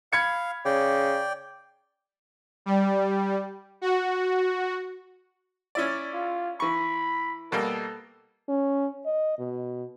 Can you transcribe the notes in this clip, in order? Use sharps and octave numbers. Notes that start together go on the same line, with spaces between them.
F5 B5 G#6 C#7
C#3 D5 G5
G3
F#4
C#4 E4 D5
F4
E3 B5 C#6
B2 G3 A#3 A4
C#4
D#5
B2